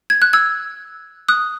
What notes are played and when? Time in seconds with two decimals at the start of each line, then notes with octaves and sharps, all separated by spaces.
0.10 G#6
0.22 F#6
0.33 E6 G#6
1.29 D#6 F#6